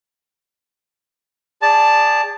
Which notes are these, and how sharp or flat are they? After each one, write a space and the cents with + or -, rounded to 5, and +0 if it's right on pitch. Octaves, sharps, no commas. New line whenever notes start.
G#4 -25 D5 +0 A5 +0